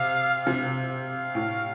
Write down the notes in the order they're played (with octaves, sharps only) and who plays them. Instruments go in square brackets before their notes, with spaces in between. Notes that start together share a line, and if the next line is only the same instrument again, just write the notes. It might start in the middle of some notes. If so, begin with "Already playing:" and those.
Already playing: [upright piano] C3 [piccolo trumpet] F5
[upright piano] C3
[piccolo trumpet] F5
[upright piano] A2